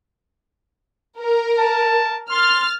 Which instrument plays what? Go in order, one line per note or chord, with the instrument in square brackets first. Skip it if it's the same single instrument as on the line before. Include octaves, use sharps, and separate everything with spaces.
[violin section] A#4
[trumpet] A5
[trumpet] C6 [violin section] F6 A6